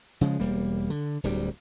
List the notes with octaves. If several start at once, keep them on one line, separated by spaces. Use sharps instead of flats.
C#3 F3 G#3
E1 G3 A#3
D3
D1 D2 G3